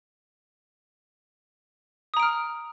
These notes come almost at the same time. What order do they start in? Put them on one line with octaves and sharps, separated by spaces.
D#6 A#5 D7 F6